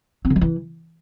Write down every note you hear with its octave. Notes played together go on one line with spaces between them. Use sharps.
C4
D3
F3
E3